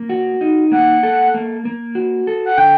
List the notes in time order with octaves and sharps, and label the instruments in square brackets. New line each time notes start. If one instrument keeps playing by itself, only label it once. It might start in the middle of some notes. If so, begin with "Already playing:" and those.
Already playing: [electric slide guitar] A#3
F#4
D#4
[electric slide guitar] A#3 [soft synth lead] F#5
[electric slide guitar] A4
A#3
A#3
F#4
A4
[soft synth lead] F#5
[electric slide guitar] D3 [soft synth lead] G5